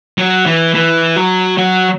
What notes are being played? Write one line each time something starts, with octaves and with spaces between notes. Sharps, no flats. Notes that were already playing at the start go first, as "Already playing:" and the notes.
F#3
E3
E3
F#3
F#3